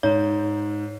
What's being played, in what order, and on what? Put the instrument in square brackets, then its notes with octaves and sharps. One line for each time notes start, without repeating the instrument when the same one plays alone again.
[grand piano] G#2 [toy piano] C#5 A#5